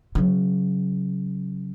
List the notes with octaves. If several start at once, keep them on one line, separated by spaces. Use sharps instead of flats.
C#3 F#3